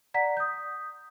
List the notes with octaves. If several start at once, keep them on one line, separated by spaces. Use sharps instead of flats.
D5 F#5 A#5 B6
D#6 G6